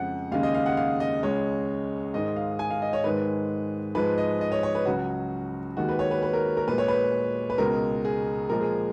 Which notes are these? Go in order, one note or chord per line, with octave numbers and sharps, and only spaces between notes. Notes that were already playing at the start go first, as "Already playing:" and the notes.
Already playing: F2 C#3 F3 G#3 F#5
D#2 C#3 G#3 F5
D#5
F5
F#5
F5
D#5
C#2 C#3 G#3 C#5
G#2 D#3 G#3 D#5
F5
G#5
F5
D#5
C#5
G#2 D#3 G#3 B4
G#2 F3 G#3 B4
D#5
D#5
C#5
C#5
B4
C#2 C#3 F#3 F#4
D#2 D#3 G#3 F#4
B4
C#5
B4
B4
A#4
A#4
A#2 G#3 B4
C#5
B4
B4
C#2 B2 G#3 A#4
G#4
A#2 F3 G#3 A#4
G#4